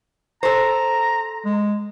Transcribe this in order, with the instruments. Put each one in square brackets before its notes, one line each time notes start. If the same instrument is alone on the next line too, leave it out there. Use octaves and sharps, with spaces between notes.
[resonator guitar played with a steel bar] A4 C5 [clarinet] A#5
[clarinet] G#3